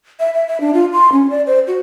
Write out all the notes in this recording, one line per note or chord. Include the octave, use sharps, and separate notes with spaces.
E5
E5
E5
D4
F4
C6
C#4
D5
C5
F#4